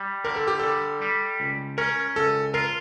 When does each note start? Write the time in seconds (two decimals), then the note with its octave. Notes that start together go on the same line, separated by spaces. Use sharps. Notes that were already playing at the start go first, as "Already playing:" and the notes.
Already playing: G3
0.25 D3 A#4
0.36 A4
0.47 G4
0.59 G3 A4
1.02 G3
1.40 C#2
1.78 C#4 A#4
2.16 C#2 A4
2.54 F4 A#4